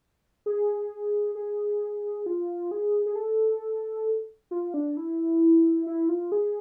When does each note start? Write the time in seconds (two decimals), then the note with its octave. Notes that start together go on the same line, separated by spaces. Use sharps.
0.46 G#4
1.35 G#4
2.26 F4
2.71 G#4
3.06 G#4
3.16 A4
4.51 F4
4.74 D4
4.97 E4
5.87 E4
6.09 F4
6.32 G#4